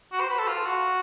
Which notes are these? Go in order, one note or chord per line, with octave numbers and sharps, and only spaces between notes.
F#4
C5
B4
A4
F4
F#4